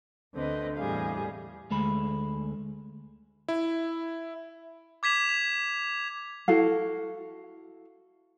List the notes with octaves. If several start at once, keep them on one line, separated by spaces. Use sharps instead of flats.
D2 D3 C4 B4 D#5
E2 A2 G3 G#4 F5
D2 G#3 A3 B5
E4
D6 G#6 B6 E7 F7
E4 F#4 A4 F5